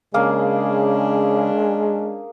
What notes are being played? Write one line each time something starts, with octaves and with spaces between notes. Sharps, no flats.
C#3 G#3 A#3 C#4 D4 G#4 F5